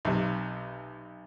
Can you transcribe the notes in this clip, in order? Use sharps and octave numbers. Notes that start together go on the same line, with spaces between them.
B1 C3